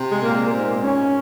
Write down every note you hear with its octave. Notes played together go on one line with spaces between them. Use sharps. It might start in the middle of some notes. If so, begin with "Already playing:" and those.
Already playing: C3
G#3
A#2 A#3
A#3
G#2 C4
G#2 C#4